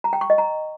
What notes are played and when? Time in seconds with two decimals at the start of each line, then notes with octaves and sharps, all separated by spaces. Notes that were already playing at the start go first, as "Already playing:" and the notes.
0.04 A#5
0.13 G5
0.21 C#6
0.30 D#5
0.38 A#5